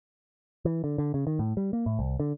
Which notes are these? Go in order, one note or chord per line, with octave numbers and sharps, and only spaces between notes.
E3
D3
D3
C#3
D#3
A2
G3
A#3
A2
C2
D3